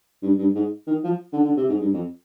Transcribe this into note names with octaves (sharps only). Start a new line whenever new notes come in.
G2
G2
G#2
D#3
F3
D3
D3
C3
G#2
G2
F2